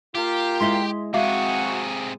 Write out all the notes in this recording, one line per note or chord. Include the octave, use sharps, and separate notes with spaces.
A#3 F4 G4
G#3 E4 D#5 C6 B6 G7
C3 G#3 C4 F#4 G#4 E5 F5 D6